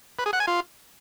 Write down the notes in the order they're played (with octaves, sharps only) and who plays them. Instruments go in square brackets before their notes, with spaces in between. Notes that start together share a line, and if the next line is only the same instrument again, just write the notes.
[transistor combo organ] B4
G#4
F#5
G#5
F4